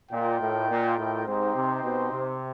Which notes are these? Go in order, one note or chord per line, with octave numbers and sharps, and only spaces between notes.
A#2 F4 A#4 D#5 G5
A2
A#2
A2
G#2 C4 D#4 G4 C5
C3
B2
C3